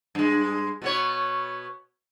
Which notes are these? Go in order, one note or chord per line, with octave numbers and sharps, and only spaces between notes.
G2 G#3
B2 B3 C#5